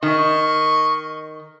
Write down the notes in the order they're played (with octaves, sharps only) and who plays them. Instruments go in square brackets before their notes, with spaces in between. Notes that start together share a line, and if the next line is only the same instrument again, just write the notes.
[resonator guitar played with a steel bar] D#3 [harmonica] D#5 C#6